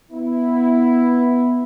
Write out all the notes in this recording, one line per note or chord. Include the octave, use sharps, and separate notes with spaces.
B3 E4